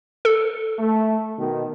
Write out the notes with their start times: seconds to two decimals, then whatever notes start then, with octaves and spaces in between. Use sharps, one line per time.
0.25 A4
0.78 A3
1.39 B2 D#3